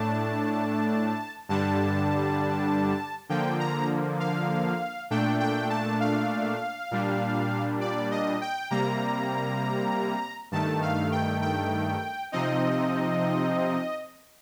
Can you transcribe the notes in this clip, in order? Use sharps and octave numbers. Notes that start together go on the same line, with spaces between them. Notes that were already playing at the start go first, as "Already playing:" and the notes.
Already playing: A2 A3 D4 A5
G2 D3 G3 D4 A5
D3 F3 A#3 G5
A#5
F5
A#2 A3 D4 G5
G5
A5
F5
A#2 G3 D4
D5
D#5
G5
C3 G3 A#3 A#5
G2 D#3 A3 A5
F5
G5
G5
C3 F3 C4 D#4 D#5